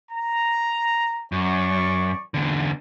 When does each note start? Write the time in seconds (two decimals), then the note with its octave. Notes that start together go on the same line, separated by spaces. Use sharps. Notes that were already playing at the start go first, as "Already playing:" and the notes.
0.11 A#5
1.32 F#2 D5 C#6
2.34 E2 D3